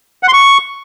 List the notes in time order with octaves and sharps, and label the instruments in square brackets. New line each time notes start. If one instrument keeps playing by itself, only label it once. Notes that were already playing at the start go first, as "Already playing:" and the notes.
[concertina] F#5
C6
C#6